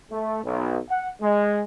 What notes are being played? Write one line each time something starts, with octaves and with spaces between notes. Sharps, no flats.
A3
B1
F#5
G#3